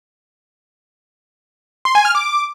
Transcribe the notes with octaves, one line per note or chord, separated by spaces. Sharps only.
C6
G#5
F6
D6